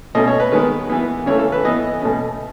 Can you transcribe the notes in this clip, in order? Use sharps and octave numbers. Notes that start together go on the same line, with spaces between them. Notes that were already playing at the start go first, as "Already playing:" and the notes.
B2 A3 C#4 D#5
C#5
B4
D#3 G#3 B3 B4
E3 B3
C#3 E3 A3 C#5
A4
B4
E3 B3 D#5
B2 A3 C#4